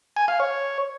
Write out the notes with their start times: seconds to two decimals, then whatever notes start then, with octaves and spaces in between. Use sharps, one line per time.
0.16 G#5
0.28 F5
0.40 C#5